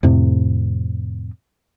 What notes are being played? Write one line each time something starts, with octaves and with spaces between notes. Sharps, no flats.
F2 A2 C3